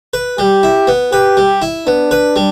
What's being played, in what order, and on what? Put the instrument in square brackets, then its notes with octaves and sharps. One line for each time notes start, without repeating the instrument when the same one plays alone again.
[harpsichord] B4
[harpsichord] G3 [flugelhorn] G4
[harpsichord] E4
B3
[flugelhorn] G4 [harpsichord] B4
[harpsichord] G3
E4
[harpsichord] B3 [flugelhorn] D4
[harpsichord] B4
G3